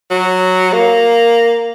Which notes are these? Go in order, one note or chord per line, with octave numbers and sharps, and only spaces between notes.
F#3
A#3